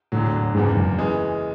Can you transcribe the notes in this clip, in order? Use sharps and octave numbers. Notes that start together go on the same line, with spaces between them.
E1 D2 A2 D3 F#3
F#1 E2 G#2 C#3
F#2
E3 G#3